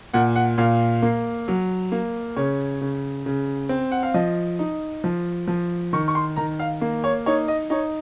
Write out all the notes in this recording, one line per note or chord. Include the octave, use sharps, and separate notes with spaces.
A#2 F#5
F#5
A#2 F5
A#3
F#3
A#3
C#3 C#5
C#3
C#3
C4
F#5
F5
F3 D#5
D#4
F3
F3
D#3 C#6
C#6
C6
D#3 A#5
F5
A#3
C#5
D#4 C#5
D#5
D#4 C#5